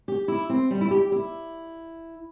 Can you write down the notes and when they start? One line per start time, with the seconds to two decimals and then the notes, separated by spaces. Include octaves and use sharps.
0.08 G4
0.28 E4
0.49 C4
0.71 G3
0.81 E4
0.91 G4
1.12 E4